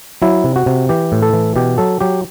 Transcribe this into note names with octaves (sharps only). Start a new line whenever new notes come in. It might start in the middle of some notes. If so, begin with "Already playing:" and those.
F#3 E4
C3
F#4
C3
E3 G4
A2
A4
E3
B2 G4
F#3 A4
F#3 G4